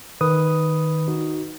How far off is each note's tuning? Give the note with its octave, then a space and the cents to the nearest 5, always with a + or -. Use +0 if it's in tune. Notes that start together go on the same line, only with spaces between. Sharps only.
D#3 +0 B4 +0 D#6 +0
D#4 +0 F#4 +0